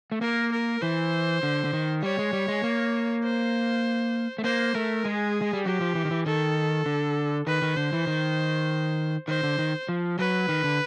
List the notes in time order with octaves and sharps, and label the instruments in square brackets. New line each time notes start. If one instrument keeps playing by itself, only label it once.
[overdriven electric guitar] A3
[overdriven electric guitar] A#3 [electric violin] A#4
[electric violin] A#4
[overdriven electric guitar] E3 [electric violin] C5
[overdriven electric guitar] D3
D3
D#3
[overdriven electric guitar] G3 [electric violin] C#5
[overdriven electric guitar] G#3
G3
G#3
A#3
[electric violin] C5
[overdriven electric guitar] A3
[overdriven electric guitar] A#3 [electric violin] C5
[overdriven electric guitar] A3 [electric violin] A#4
[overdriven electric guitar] G#3 [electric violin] G#4
[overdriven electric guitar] G#3
G3
[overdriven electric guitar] F#3 [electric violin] G4
[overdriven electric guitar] F3
E3
D#3
E3
[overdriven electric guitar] D#3 [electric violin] A4
[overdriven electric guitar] D3
[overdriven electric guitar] D#3 [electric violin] B4
[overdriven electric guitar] D#3
[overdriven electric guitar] D3 [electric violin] C5
[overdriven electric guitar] E3
D#3
[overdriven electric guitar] D#3 [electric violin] C5
[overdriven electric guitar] D3
D#3
F3
[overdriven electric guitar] F#3 [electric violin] B4
[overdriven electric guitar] D#3
D3